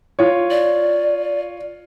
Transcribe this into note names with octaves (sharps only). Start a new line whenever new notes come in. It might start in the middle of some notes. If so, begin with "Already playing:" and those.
F4 C#5
D5